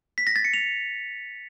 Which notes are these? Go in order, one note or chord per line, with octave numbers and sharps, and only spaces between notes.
B6
A#6
A6
C#7
F7